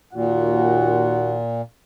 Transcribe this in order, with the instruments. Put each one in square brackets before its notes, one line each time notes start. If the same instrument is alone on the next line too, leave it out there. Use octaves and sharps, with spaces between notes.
[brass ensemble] D#2 F#4 F#5 [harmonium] A#2